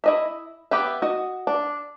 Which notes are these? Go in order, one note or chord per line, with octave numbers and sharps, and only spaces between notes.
E4 D#5 E5
B3 G4 B4 E5
F#4 D#5
D4